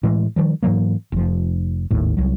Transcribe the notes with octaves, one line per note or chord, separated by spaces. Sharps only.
A2 E3 G#3
D#3 F3 G3
G#2 E3 F#3 A#3
F1 F3
G#1 D#2 A2
C2 F#3